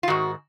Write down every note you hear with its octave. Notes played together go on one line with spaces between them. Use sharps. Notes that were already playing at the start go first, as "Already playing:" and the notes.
F4
G#2 D#3 F#4